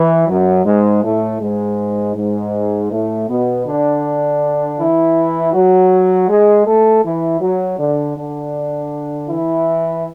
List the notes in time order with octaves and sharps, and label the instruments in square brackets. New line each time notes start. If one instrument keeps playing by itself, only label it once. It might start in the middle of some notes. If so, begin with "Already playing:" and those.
Already playing: [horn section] E3
F#2 F#3
G#2 G#3
A2 A3
G#2 G#3
G#2 G#3
A2 A3
B2 B3
D3 D4
E3 E4
F#3 F#4
G#3 G#4
A3 A4
E3 E4
F#3 F#4
D3 D4
D3 D4
E3 E4